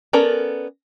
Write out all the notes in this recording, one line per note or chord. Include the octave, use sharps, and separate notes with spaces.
B3 C#4 A4 A#4 D5